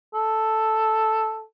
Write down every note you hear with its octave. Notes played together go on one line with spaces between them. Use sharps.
A4